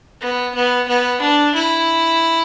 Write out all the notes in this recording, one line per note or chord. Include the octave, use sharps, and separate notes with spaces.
B3
B3
B3
D4
E4